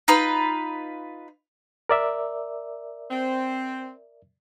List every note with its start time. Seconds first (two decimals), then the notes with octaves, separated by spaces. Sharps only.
0.08 D#4 F4 B4
1.89 A#4 D5 E5
3.11 C4